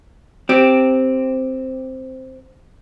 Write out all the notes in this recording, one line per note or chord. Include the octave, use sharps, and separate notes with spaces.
C4 G4